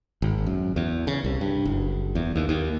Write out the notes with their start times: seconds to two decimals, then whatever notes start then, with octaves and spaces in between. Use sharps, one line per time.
0.22 G#1
0.47 F#2
0.76 E2
1.07 C#3
1.25 C2
1.41 G2
1.65 F#1
2.15 E2
2.36 D#2
2.49 D#2